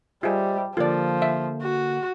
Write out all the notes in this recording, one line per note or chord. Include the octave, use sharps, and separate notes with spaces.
G3 F4 G#4 C5 D#5 E5
D3 F3 A#3 F4 A4 D5
E5
F#4